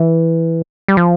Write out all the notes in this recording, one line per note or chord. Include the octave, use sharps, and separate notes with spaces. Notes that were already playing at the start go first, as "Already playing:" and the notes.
Already playing: E3
G3
F3